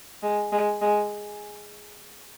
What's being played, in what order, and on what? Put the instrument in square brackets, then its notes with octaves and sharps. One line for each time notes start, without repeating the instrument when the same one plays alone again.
[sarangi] G#3
G#3
G#3